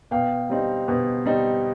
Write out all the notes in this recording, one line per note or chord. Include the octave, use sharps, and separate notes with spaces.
B2 F5 G5
G3 C4 D#4
B2
G3 C4 D#4